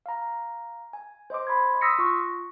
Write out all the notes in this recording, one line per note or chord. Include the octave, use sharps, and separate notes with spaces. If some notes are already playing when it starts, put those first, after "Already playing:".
F5 A#5
G#5
C5 D#5 C6 D6
B5 C6 G#6
C6 D#6 E6 A#6 B6 C#7
F4 C#6